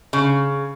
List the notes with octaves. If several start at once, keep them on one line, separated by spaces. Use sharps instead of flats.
C#3